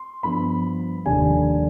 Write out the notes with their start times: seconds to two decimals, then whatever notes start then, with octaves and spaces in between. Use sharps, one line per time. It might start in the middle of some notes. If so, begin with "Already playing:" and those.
Already playing: C6
0.23 G2 F3 B3 B5
1.06 F1 D#2 D3 G3 D4 G#5